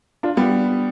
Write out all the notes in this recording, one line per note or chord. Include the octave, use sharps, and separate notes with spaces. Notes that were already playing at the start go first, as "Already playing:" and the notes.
D4 F4
G3 B3